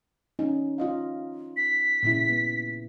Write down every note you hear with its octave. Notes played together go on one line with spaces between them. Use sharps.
C#4 D#4
F4 D#5 F5
B6
A#2 C#3 E4
B3